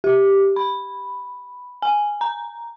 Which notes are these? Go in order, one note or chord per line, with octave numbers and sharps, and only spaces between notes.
G4
B5
G#5
A#5